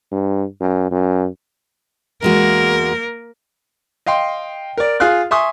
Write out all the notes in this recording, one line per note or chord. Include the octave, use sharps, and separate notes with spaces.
G2
F#2
F#2
E2 G#3 A#3 F#4 A#4
D#5 F5 G5 C6
A#4 D5
F4 G#4 F5 F6 F#6
E5 G#5 C6 C#6 D#6